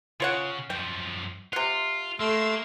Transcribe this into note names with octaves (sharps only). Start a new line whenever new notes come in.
C#3 F4 C#5 F#5
F#2 F3 G5
C3 F4 F#5
A3 A#3 C6 E6